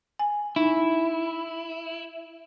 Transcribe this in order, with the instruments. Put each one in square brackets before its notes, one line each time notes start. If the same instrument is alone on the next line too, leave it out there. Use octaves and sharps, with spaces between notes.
[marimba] G#5
[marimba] D#4 [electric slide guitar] E4